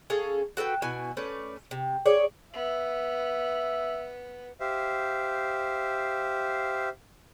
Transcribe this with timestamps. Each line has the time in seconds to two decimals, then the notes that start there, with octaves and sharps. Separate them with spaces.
0.10 C#4 G#4 A4 F5
0.57 F#4 A4 B4 G5
0.82 B2 E4 F#4 G#5
1.17 A3 C#4 B4 D5
1.71 C3
2.06 G#4 C#5 D5
2.53 B3 E5
4.60 G4 C5 E5 F5